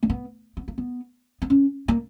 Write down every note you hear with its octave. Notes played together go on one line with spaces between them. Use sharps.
A#3
B3
B3
A#3
B3
B3
C#4
A#3